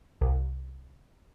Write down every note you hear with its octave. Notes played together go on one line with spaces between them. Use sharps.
C2